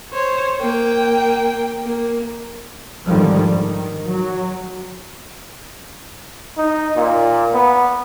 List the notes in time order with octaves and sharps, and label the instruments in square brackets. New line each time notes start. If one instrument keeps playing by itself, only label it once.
[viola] C5 C#5
A#3 G5
A#3
[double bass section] F2 G#2 D3 D#3 F3 G3
D#3
F#3
[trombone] D#4
A#2
B3